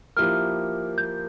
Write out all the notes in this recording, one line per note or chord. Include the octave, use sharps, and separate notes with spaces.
F3 A#3 E4 G4 A#4 F6
G6